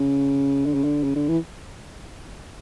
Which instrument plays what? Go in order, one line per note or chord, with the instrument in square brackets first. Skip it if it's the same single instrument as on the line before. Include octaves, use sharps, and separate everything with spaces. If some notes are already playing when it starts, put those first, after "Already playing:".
Already playing: [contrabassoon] C#3
D3
C#3
D3
C#3
D3
E3